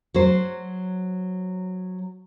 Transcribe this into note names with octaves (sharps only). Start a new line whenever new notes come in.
F#3 C5